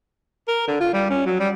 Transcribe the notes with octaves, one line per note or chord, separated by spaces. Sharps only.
A#4
D3
F4
G3
C#4
F#3
G3